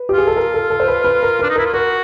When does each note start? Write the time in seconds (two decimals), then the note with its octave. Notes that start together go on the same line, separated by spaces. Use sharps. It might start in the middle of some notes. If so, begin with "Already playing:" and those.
Already playing: B4
0.09 G4
0.13 F4 G#4
0.27 A4
0.37 A#4
0.54 A4
0.70 A4
0.80 C5
0.88 B4
1.04 B4
1.23 A#4
1.39 D4 B4
1.50 D#4
1.56 E4 A#4
1.66 F4
1.74 F#4 A#4